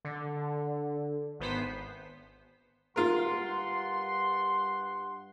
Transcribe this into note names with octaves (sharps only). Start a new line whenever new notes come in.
D3
G#1 B3 C5 B6
G2 F4 A#4 F#5 C6